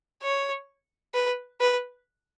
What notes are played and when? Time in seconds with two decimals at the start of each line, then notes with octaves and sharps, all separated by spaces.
0.23 C#5
1.14 B4
1.61 B4